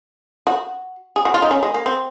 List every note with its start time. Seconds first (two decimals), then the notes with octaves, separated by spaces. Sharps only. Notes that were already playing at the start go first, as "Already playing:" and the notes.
0.47 F#4
1.16 G#4
1.25 F#4
1.34 F4
1.42 D#4
1.51 C#4
1.63 G#3
1.74 A#3
1.86 C4